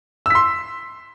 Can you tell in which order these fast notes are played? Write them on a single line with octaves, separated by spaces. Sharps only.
E6 B6 C6